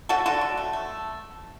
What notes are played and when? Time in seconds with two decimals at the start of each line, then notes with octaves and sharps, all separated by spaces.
0.09 A3 F#4 A4
0.26 D3 F#4 A4
0.41 D3
0.57 A3
0.73 A3